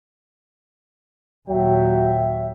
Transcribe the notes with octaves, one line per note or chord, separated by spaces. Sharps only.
D#2 A#2 F#3 E5 G5